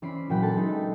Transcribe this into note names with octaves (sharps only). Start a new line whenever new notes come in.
E3 C4 C#4 D5 B5 C7
A#2 E3 F#3 F#5 G5 B5
D4 A4 A5 B5
G#3 C4 D#4